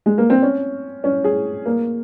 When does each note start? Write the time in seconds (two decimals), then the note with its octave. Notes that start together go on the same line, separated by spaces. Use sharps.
0.06 G#3
0.18 A#3
0.30 C4
0.42 C#4
1.04 C#4
1.24 G#4
1.66 A#3